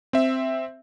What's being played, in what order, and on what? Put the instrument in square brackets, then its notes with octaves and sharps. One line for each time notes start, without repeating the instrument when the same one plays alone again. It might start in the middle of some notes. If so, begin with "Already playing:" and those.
[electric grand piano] C4 E5